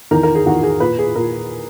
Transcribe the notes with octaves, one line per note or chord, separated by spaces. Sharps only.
E2 D#3 A#4
A#4
G#4
E2 D#3 F#4
G#4
A#2 B4
G#4
A#2 A#4